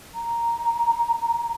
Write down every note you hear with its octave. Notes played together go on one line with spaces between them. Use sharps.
A#5